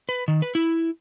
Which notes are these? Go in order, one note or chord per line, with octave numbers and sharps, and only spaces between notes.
B4
D#3
B4
E4